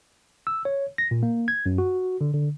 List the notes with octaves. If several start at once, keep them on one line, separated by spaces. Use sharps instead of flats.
E6
C#5
A#6
A#2
A#3
G#6
F#2
F#4
D3
D3